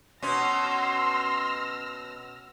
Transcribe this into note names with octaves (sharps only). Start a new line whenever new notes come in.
B2 C#4 C6 E6 F6 A#6